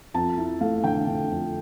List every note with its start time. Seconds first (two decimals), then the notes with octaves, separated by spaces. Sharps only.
0.14 F2 A5
0.38 E4
0.61 A3 F5
0.84 D3 G5
1.07 D3
1.30 F2